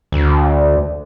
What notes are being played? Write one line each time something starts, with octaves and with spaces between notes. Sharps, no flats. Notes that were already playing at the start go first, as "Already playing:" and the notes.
D2